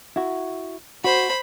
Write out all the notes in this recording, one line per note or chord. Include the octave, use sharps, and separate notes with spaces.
E4 F#4
F#4 C5 B5